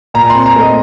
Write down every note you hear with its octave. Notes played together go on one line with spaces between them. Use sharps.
A#2 A#5
C4 C6
A#5
A3 D#5